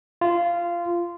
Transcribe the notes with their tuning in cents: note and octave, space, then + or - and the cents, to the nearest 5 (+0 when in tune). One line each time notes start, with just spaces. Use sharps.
F4 -15